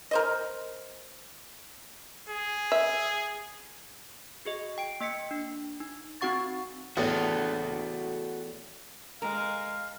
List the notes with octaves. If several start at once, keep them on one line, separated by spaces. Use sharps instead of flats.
A#4 C5 D#5
G#4
E5
F#4 G#4 D#5
G5 D7
A#3 D#5 B6 C#7
D4
D#4
C4 D#4 F#4 F#5 C#6 A6
E2 A2 F#4 A4
G#3 A#4 F5